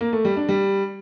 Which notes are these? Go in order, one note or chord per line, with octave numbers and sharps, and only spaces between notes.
A#3
A3
G3
D4
G3